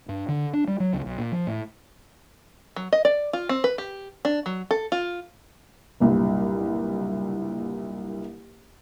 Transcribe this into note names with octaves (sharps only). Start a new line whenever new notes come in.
G2
D3
D4
G3
F#3
C#2
B1
A#2
F3
A2
F#3
D#5
D5
F4
C4
B4
G4
D4
F#3
A4
F4
F#1 C2 G2 A#2